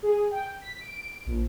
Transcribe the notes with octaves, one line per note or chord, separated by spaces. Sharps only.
G#4
G5
B6
D7
A#1